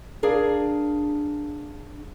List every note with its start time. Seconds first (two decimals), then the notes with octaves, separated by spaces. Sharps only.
0.23 D4 G#4 A#4 F5